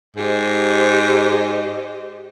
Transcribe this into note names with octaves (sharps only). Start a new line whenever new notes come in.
G#2 G4 C5 D#5